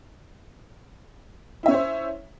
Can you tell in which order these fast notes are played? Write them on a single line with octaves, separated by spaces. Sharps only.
E4 E5 C#4 C#5 C5